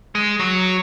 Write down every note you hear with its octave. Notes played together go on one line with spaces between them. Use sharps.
G#3
F#3